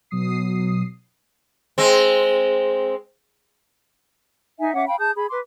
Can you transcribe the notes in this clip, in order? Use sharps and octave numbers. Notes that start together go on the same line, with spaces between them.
B2 F#3 D#6 C7
G#3 C4
D#4 E5 G#5
C#4 E5 F#5 D6
F5 G5 B5
G#4 A5 D#6 G6
G#4 B5
B4 C6 D6